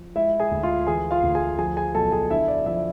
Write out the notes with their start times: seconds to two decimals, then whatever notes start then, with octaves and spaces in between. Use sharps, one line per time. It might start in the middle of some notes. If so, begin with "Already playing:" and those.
Already playing: F3
0.15 G#3 E4 E5
0.40 G#4 G#5
0.51 D2
0.63 F4 F5
0.87 E3 G#4 G#5
1.11 F4 F5
1.23 D2
1.35 G#4 G#5
1.58 F3 G#4 G#5
1.77 G#4 G#5
1.95 B1 A4 A5
2.12 G#4 G#5
2.30 D3 E4 E5
2.48 D5
2.66 F3 E4 E5